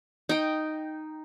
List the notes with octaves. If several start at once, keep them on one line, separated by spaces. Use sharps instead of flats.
D#4 G5